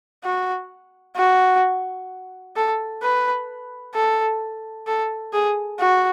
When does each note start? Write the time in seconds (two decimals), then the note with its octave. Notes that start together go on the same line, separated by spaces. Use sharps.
0.24 F#4
1.17 F#4
2.56 A4
3.02 B4
3.95 A4
4.87 A4
5.33 G#4
5.80 F#4